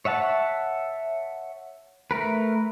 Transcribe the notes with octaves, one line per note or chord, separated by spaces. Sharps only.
C#5 E5 F#5 A5
A3 A#4 B4